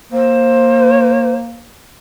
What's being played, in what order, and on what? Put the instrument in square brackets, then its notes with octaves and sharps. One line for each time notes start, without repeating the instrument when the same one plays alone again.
[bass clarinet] A#3 [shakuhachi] C5